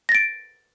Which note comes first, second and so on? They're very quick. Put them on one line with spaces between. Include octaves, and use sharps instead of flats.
A#6 A6 D7